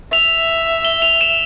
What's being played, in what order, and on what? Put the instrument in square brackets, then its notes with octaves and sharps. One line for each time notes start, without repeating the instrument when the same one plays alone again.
[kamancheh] E5 [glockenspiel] F7
[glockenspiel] G7
F7
E7